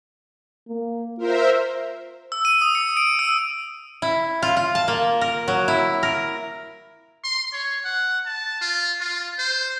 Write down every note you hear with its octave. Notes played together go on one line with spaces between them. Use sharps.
A#3
F4 A#4 C5 E5
E6
D#7
D#6
C#7
D7
E6
E4
F4
F4
A5
A#3
A#4
F#3
E4
A#4
C6
C#5
F#5
A5
F4
F4
C5